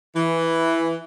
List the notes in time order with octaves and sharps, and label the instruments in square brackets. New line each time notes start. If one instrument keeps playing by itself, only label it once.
[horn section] E3